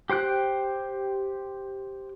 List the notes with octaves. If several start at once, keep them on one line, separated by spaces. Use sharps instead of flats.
G4 C5 G5 F#6